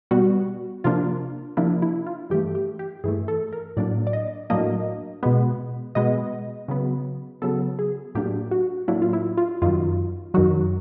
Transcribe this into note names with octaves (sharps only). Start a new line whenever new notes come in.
B2 G3 B3 F#4
C3 F3 A#3 D4 F4
C3 F3 A#3 D4 E4
E4
F4
G2 E3 A3 G4
G4
G4
G2 E3 A3 G#4
A4
A#4
A2 F#3 A#3 D4 D5
D5
D#5
A2 F#3 A#3 D4 D#5
B2 G#3 B3
B2 G#3 B3 D#5
C#3 F#3 B3
C#3 F#3 B3 A4
G#4
A2 F#3 A#3 D4 G4
F#4
A2 F#3 A#3 D4 E4
F4
E4
F4
F#2 D#3 F#3 F4
F#2 D#3 F#3 F#4